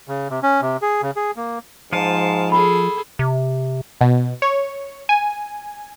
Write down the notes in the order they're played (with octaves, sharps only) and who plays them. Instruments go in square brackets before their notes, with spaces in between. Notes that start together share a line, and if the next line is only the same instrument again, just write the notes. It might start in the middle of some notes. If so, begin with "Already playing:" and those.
[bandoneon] C#3
C3
C#4
C3
G#4
C#3
G#4
A#3
[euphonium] G#2 [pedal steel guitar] F3 F4 [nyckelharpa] A5
[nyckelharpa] G#4 A4 [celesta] B5
[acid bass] C3
[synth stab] B2
C#5
G#5